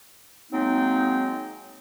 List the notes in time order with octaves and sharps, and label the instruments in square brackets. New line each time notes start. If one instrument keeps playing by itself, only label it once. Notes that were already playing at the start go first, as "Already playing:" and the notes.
[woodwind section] F#3 G#3 A#3 C4 D#4